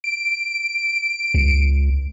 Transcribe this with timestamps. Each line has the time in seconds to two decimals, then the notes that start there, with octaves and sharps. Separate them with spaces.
0.04 D7
1.34 C#2